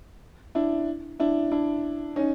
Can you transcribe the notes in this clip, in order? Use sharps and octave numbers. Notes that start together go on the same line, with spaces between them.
D4 E4
D4 E4
D4 E4
C#4 D#4